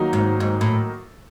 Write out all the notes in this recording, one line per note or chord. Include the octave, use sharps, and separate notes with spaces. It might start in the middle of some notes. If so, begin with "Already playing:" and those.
Already playing: D#3 F#3 A#3 D#4
G#2
G#2
A2